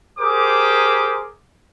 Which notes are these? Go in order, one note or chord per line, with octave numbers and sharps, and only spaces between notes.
G4 G#4 A#4 C5 D6 D#6